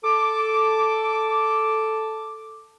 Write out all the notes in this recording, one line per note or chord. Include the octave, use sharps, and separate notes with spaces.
A4 D6